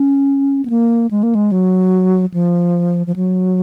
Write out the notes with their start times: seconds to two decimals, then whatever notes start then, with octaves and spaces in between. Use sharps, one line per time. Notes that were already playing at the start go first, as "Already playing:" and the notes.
Already playing: C#4
0.65 B3
0.70 A#3
1.11 G#3
1.23 A#3
1.35 G#3
1.52 F#3
2.34 F3
3.07 F3
3.16 F#3